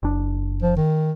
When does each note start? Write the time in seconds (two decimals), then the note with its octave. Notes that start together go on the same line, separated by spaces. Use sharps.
0.03 F#1 D4
0.62 F3
0.77 D#3